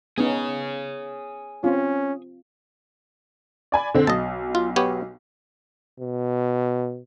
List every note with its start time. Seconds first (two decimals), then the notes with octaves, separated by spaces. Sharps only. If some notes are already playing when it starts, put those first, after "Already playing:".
0.18 B3 C#4 D#4 G#4 C#5
1.64 C4 C#4 F4
3.72 D5 G#5 B5
3.94 D3 C4
4.07 B1 D#5 A5
4.55 F4
4.76 B3 G4 C#5
6.00 B2